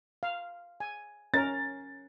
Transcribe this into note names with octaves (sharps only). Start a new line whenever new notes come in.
F5
G#5
C#4 A#4 A6